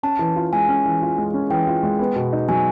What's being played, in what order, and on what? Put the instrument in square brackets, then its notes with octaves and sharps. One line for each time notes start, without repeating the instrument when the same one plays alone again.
[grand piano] C#4 [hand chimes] A5
[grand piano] E3
F4
[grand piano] G#3 [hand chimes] G#5
[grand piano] C#4
E3
F4
G#3
C#4
[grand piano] E3 [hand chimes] G5
[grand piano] F4
G#3
B3
B2
D#4
[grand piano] F#3 [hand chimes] G#5